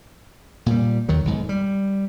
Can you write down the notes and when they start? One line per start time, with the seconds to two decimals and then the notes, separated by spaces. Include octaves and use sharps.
0.66 A#2 G3
1.09 D#2 D#3 F#3
1.25 B1 G#2
1.49 G3